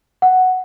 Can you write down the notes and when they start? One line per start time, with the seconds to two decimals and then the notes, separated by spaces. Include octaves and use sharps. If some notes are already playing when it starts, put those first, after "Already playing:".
0.22 F#5